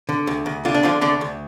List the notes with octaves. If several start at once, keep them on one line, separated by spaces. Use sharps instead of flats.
D3
D2
D2
D3 F4
D4
D3 F3 F4
D2 D3 D4
D2